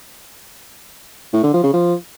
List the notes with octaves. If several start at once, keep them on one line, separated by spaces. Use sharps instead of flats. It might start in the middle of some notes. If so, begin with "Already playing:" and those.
A2
D3
F3
C#3
F3